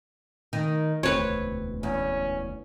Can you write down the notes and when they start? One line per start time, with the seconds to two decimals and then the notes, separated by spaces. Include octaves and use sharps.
0.53 D#3
1.03 E1 D2 C4 B4 C#5
1.83 E2 C#4